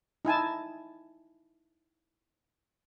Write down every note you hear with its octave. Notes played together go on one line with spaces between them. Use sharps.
D#4 E4 G#5 A5